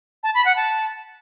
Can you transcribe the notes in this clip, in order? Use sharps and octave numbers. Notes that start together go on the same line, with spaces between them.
A5
B5
F#5
A5